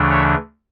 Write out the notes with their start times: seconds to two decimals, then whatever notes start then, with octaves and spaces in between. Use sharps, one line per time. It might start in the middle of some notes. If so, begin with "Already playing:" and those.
Already playing: D2 C#3 E3 A3 D4
0.10 C#5 E5